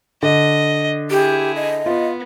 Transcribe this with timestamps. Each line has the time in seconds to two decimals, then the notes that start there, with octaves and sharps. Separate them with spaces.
0.23 D3 D#5
1.11 E4 G4 G#4
1.56 D#5
1.86 B3 F4